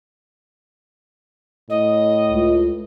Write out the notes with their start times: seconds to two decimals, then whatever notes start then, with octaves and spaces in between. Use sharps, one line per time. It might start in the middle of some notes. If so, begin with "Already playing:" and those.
1.70 A2 D#5
2.28 C#2